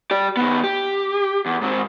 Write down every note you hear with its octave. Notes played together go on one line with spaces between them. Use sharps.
G4 D5
D#3 B3
G4
E2
G#2 C4